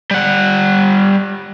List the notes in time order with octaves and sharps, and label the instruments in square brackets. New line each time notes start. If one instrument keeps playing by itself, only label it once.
[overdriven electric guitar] G3 F#5